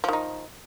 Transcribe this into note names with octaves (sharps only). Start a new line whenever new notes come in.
D#3 F3 D#4